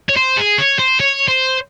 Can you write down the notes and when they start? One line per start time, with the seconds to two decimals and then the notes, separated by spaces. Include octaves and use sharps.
0.09 C#5
0.17 C5
0.37 G#4
0.58 C#5
0.79 C5
1.00 C#5
1.28 C5